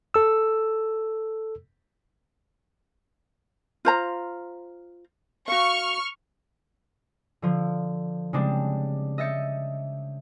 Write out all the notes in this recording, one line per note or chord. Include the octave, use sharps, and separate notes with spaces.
A4 E6
F4 C5 A#5
F#4 F5 C#6 F6
D3 F3
C#3 G3 G#3 C4 D4
D#5 E5 G6 A6 C#7